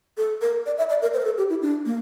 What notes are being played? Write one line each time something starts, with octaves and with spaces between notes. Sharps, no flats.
A4
A#4
D5
E5
D5
A#4
C5
A#4
A4
G4
E4
D4
A#3